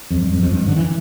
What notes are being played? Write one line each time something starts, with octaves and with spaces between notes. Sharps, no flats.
F2
G2
F2
F2
G2
D3
E3